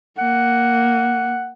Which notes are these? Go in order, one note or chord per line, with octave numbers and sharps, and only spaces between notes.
A#3 F#5